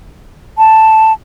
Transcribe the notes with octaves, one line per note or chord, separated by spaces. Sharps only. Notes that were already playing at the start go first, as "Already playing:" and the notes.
A5